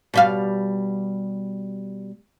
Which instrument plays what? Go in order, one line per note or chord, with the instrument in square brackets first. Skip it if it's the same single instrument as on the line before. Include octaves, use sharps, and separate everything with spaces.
[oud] B2 G3 F5